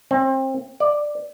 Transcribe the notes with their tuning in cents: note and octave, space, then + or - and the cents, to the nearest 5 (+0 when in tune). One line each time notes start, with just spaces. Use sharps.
C4 +30
D5 +10